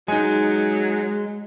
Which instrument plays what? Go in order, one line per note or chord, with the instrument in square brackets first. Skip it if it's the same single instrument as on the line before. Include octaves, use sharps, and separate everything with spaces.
[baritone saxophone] F#3 [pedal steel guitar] G#3 [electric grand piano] D#4 G#5